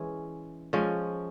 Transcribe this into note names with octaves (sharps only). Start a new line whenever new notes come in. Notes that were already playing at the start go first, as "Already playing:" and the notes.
Already playing: E3 G#3 C#4
F3 G#3 C#4